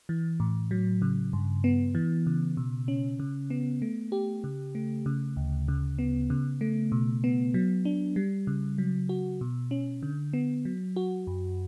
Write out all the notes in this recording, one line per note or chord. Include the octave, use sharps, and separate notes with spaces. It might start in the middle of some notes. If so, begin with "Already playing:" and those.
E3
A2
F#3
C#3
G2
B3
E3
C#3
B2
C#4
C#3
B3
A3
G4
C#3
A3
C#3
D2
C#3
B3
C#3
A3
B2
B3
F#3
D4
G3
C#3
F#3
F#4
B2
C#4
D3
B3
F#3
F#4
F#2